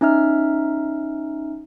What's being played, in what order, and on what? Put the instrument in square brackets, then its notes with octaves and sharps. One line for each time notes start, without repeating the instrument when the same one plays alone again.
[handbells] C#4 D#4 E5 F6